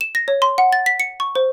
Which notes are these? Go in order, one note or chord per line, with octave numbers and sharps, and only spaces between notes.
E7
A#6
C#5
C6
F#5
A6
B6
C#7
C#6
C5